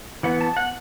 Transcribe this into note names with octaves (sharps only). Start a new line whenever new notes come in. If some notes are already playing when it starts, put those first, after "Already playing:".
E3 B3 F#5
A5
F#5